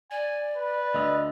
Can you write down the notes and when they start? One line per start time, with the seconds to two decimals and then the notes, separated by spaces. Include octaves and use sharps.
0.11 D5 G#5
0.56 B4
0.94 D2 D3 D#5